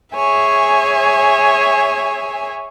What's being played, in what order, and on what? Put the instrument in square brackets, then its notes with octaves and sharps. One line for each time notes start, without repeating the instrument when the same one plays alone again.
[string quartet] G#4 C#5 E5 G#5